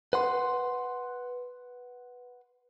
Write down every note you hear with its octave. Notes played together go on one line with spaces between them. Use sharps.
B4 F#5 C6